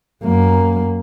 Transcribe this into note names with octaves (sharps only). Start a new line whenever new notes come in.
F#2 A#3